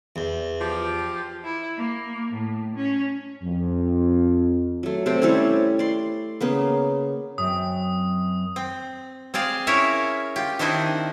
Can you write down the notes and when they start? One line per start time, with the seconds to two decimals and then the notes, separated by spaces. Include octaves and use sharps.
0.16 E2
0.60 F3 G4
1.43 E4
1.78 A#3
2.32 A2
2.76 C#4
3.44 F2
4.83 F#3 A3
5.06 C3 A3 G4 C5
5.22 G3 C#4 E4 C#5
5.79 D5 C6
6.41 C#3 A#3 B3
7.38 F#2 C4 D#6
8.56 C4
9.34 C4 G#4 D5 F5
9.67 C#4 E4 A#4 C#5 E5
10.36 F4 G4
10.59 D#3 C4 D4 E4 C5 D#5